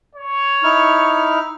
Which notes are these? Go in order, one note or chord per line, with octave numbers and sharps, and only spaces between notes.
C#5
D#4 E4 F6